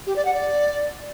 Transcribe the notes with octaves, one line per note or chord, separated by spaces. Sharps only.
G4
D5
F#5
D5